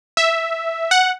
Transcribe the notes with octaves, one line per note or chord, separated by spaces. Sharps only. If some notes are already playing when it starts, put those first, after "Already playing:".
E5
F#5